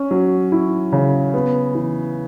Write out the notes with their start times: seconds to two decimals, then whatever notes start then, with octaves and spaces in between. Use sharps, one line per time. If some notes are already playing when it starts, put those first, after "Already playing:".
Already playing: C#4
0.11 F#3
0.52 E4
0.92 C#3
1.34 B3
1.75 E3